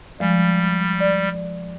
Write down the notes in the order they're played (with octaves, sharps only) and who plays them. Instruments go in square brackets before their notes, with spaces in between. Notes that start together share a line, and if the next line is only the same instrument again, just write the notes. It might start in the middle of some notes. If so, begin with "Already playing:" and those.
[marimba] F3 G#3 [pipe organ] G3
[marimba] D5